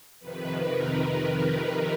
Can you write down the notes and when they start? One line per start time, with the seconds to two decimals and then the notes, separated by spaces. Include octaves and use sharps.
0.20 F2 C3 D#3 B4
0.59 A#4
0.99 A#4
1.38 B4